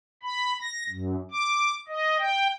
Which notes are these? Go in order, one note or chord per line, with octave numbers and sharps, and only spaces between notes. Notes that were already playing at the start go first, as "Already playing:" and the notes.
B5
A#6
F#2
D6
D#5
G5